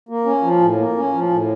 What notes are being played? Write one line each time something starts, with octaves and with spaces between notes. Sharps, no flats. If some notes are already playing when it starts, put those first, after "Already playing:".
A#3
C#4
F3
A2
A#3
C#4
F3
A2